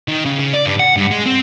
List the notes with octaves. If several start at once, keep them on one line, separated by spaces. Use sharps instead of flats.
D#3
C#3
C#3
D5
G2
F#5
G2
G#3
C4